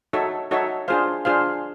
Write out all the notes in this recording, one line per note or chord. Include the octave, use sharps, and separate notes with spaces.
D#4 F#4 A4 C#5 E5
D#4 F#4 A4 C#5 E5
D4 F4 G#4 C5 F5
D4 F4 G#4 C5 F5